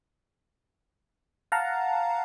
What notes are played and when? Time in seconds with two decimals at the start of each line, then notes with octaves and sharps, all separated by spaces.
1.52 F5 F#5 A5 A#5